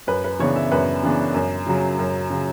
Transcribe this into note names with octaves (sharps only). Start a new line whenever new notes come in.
F#2 B4
B4
C#3 E3 B3 D4 C#5
E5
F#2 B4
C#3 E3 B3 D4
F#2
C#3 F#3
F#2
C#3 F#3